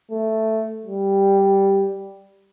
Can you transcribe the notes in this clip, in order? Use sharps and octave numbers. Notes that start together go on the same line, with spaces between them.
A3
G3